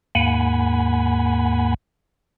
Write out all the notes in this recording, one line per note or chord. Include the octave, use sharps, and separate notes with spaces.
D#2 G#2 A#3 F#5 G#5 B5